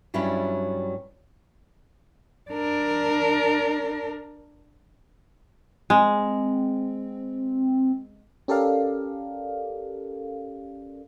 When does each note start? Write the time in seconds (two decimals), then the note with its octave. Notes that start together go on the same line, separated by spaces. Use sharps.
0.14 G2 F#3 G3 C#4 D4 E4
2.51 D4 A#4
5.90 G#3 C4
8.48 C#4 G4 A4 A#4 D5 F5